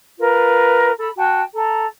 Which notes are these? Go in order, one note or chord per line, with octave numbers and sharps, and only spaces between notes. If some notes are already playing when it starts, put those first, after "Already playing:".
F4 A#4 B4
A4 B5
F#4 G5 A5
A4 A#5